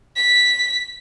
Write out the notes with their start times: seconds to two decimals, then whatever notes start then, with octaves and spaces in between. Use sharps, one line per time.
0.16 B6